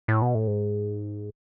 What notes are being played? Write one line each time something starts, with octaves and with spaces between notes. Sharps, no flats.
A2
B2
A2
G#2